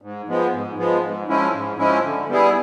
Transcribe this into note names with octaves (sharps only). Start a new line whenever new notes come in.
G#2
F3 G#3 B3
G#2
F3 G#3 B3
G#2
F3 G#3 C#4 E4
G#2
F3 G#3 C#4 E4
D3
G3 B3 E4 G#4